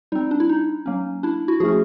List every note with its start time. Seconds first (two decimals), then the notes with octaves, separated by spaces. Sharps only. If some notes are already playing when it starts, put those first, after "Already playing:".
0.12 G3 C4 D#4
0.31 D4
0.40 E4
0.49 D#4
0.86 F#3 A#3 C#4
1.23 D4 E4
1.48 E4 F#4
1.60 F3 A3 C#4 F#4 G#4